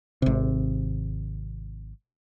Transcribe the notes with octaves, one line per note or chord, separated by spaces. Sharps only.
G#1 C3